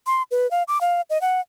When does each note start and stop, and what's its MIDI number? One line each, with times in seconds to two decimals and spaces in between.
0.07 0.23 84
0.31 0.49 71
0.51 0.63 77
0.68 0.80 86
0.81 1.01 77
1.10 1.20 75
1.21 1.41 78